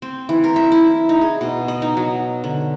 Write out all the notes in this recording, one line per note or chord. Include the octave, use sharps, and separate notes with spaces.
C4
E3
A#4
E5
E4
D#4
G#4
B2
D#5
D#4
F#3
D3